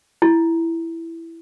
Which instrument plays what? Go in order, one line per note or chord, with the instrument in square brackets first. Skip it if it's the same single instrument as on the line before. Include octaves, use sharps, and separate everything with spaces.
[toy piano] E4